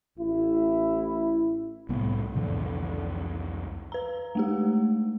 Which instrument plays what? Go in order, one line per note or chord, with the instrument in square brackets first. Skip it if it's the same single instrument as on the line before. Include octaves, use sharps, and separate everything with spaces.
[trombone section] A1 E4
[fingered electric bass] C2 B3 [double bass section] A2
[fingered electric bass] C2 F2 E3 [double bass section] D3
[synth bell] B4 A#5
G#3 A3 G4